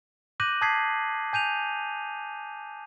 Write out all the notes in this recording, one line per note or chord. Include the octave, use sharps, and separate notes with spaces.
D6 F#6 G6 A#6 D#7 F#7
A5 D#6 G6 G#6 B6 C7
G#5 G6 D#7 F7